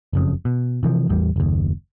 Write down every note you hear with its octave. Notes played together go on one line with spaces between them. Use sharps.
F#1 F2 C#3
B2
C3 E3 F3
A1 E2 G3
F#1 D#2